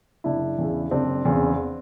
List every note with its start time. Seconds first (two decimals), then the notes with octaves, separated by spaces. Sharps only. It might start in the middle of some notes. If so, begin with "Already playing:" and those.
0.24 F#1 D4 E4
0.58 E2 C#3
0.91 F#1 C4 D4
1.25 E2 C#3